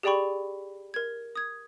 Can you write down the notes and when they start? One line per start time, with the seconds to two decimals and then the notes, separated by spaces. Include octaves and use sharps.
0.03 G4 G#4 D5 G5 B5 C#6
0.94 A#4 G#6
1.35 D#6 G#6